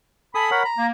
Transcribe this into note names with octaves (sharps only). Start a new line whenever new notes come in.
A4 G#5 B5 D#6
A#4 C#5 F#5
A#5
A#3